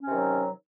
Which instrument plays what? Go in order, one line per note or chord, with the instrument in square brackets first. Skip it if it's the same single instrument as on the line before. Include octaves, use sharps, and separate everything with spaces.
[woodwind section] C#4
C3
D#3
F#3